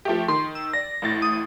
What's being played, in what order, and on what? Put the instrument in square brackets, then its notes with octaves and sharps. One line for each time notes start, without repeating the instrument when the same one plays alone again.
[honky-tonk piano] F3 A3 G4
[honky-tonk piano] D#3 [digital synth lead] C6
[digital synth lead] E6
[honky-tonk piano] D5 [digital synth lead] A#6
[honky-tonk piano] A1 A2 A6
[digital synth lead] D#6